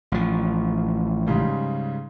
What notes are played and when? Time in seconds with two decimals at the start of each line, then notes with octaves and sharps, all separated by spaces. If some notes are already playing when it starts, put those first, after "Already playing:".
0.12 A1 F3
1.26 G#2 C#3 G3